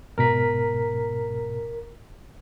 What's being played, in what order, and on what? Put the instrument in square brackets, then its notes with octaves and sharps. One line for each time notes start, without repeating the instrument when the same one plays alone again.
[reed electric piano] G#2 B2 [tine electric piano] A#4 A#5 B6